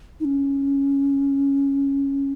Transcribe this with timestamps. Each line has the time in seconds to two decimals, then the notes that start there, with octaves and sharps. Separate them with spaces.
0.20 D#4
0.25 C#4